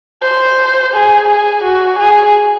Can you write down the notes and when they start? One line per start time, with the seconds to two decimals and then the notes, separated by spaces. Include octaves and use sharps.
0.22 C5
0.94 G#4
1.28 G#4
1.64 F#4
1.99 G#4